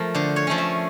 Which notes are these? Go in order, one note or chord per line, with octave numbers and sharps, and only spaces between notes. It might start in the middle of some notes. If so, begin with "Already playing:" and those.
Already playing: F3 A3 A#4
D3 C5
C#5
F3 A3 C#4
E5